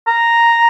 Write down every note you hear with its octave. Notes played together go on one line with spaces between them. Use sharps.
A#5